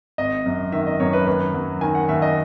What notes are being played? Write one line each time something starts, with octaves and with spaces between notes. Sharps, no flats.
G#1 D#5
F#2
D#3 E5
D#5
F#2 C#5
B4
D#2 B4
F#3
D#3 G#5
F#5
D#2 E5
D#5